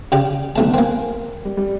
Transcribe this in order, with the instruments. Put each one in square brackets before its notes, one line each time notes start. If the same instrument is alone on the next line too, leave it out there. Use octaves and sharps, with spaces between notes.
[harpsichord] C#3 G4 D5
[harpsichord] B1 A3 A5 [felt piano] D3 B3
[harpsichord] A#3 C4 [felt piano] A#4 G#5
[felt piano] G3
G3